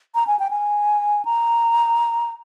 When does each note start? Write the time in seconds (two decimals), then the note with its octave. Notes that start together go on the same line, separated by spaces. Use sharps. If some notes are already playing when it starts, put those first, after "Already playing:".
0.15 A#5
0.27 G#5
0.39 G5
0.50 G#5
1.25 A#5